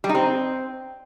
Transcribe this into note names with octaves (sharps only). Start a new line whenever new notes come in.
G3
D#4
C4